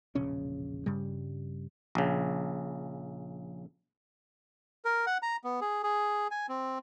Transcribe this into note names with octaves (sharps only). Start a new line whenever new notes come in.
E1 A#1 C#3 C#4
G2 C#3 G3
A#1 C#3
A#4
F#5
A#5
B3
G#4
G#4
G#5
C4